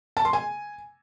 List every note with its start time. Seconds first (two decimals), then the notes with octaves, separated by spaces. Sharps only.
0.17 A5
0.25 C6
0.33 G#5